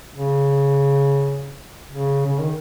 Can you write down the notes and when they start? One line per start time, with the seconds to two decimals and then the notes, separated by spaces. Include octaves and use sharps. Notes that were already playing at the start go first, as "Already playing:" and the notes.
0.15 C#3
1.91 C#3
2.26 C#3
2.40 D#3